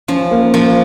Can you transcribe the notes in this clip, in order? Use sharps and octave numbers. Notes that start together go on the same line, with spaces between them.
F3 C#4
A#3
F3 A#3